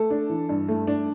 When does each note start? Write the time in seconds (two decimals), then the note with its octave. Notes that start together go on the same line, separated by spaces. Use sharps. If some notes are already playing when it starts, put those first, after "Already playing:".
Already playing: A3 A4
0.10 D4
0.30 E3
0.49 G2
0.68 A3
0.87 D4